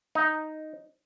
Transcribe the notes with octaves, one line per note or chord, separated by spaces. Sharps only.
D#4